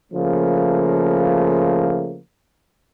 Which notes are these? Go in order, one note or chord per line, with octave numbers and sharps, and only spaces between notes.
C#3 F3 A3 A#3